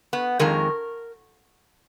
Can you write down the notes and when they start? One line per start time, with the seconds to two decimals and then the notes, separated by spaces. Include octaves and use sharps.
0.13 B3
0.39 F2 D#3 G#3 A#4